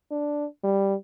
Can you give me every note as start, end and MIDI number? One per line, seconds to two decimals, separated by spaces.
0.11 0.45 62
0.63 0.94 55